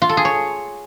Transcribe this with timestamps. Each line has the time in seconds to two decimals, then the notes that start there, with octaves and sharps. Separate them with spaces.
0.02 F4
0.09 A4
0.17 G#4
0.25 C#5